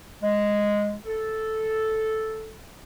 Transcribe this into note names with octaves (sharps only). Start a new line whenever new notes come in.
G#3
A4